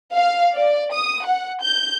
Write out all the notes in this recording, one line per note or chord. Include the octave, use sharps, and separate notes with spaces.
F5
D5
D#6
F#5
G6